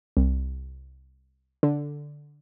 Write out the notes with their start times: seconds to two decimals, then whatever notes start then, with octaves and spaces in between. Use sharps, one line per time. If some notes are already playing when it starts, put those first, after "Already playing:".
0.17 C2
1.63 D3